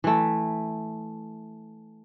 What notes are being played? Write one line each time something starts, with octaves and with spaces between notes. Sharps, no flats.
E3 A3